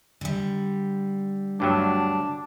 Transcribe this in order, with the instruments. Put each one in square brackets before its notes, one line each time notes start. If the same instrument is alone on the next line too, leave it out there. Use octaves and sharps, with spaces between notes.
[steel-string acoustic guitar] D3 G3
[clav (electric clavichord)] D2 G2 F#3 [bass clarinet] D4